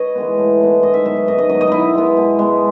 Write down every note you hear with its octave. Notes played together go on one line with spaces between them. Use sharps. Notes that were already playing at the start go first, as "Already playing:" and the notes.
Already playing: B4 C#5 D#5
E3 G#3 B3
A2
E3 G#3 B3
G#2 D#5
E5
F#3 B3 E5
E5
G#2 D#5
D#5
F#3 B3 D#5
D#5
B2 D#4 E4
G#3 B3
B2
G#3 B3